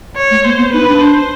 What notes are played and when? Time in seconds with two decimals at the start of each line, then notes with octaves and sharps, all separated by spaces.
0.16 C#5
0.31 A3
0.44 A#3 C5
0.58 B3
0.73 D#4 B4
0.87 D4
1.01 C5